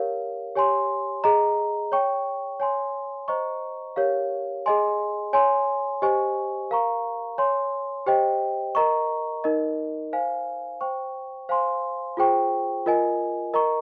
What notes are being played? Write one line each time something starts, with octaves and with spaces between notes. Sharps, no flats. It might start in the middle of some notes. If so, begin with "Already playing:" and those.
Already playing: G4 A#4 C#5 F5
G4 C#5 G#5 C6
G#4 D#5 A#5
C#5 G5 C#6
C#5 G#5 C6
C5 D#5 A#5 C#6
G4 A#4 C#5 F5
G#4 D#5 G#5 C6
C#5 G#5 C6
G4 C5 D#5 G#5 C#6
A#4 F5 A#5 C#6
C#5 G#5 C6
G4 C5 D#5 G5
A#4 D#5 A#5 C#6
D#4 A#4 D#5
C5 F5 G#5
C5 G5 C#6
C5 F5 G#5 C6
F4 G#4 C5 G5 C#6
F4 A#4 D#5 G#5
A#4 D#5 A#5 C#6